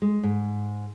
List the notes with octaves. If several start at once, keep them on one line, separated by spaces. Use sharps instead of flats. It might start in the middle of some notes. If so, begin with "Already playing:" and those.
G#3
G#2